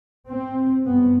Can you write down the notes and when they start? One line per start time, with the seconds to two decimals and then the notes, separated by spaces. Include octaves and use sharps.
0.29 C4
0.86 G2 B3